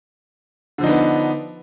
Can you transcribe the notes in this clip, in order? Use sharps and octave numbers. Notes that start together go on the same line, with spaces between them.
D3 F3 B3 D4 D#4